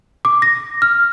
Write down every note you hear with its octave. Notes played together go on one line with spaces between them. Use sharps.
D6
A#6
F6